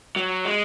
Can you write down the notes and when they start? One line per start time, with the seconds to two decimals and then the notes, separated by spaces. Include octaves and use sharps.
0.16 F#3
0.45 G#3